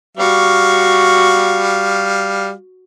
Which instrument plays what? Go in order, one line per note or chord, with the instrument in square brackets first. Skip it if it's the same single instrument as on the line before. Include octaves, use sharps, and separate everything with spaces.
[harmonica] G3 F5 [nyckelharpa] F#4 C#6